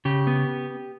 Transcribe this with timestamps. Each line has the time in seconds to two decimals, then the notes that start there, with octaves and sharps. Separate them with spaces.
0.05 C#3 G4
0.27 B3